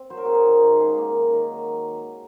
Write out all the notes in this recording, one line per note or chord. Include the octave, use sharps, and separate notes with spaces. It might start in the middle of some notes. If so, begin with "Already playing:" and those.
Already playing: C4
F#3 C5
A#4
C4 G#4
A#4
D#3
G#2
C#3 G#4
A#3
D#3
D#3
F#3